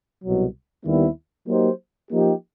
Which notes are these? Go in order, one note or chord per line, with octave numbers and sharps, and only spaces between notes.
C2 B2 F#3
D#2 D#3 G3 B3 E4
F#3 A#3 D#4 G4 C5
F3 A#3 D#4 G4